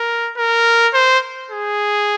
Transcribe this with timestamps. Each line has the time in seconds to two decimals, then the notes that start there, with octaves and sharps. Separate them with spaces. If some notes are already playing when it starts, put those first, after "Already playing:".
Already playing: A#4
0.37 A#4
0.94 C5
1.51 G#4